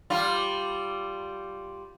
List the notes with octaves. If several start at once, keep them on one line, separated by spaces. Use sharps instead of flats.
G3 F4